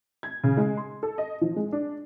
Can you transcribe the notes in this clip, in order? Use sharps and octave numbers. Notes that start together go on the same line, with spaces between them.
G#6
C#3
G#3
C6
A4
D#5
F3
G#3
D4